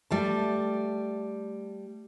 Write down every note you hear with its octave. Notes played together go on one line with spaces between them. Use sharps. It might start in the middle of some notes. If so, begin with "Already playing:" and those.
G3 A3 A5